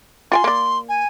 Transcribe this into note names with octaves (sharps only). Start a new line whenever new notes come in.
F4 G5 G#5 C6
A#3 D5
G#5